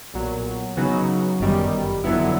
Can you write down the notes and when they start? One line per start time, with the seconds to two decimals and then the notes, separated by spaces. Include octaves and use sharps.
0.14 B1 A#2 F#3
0.77 C#3 F#3 B3 D#4 F#4
1.40 G1 F#2 D#3 G3
2.04 F2 D3 F#3 B3 E4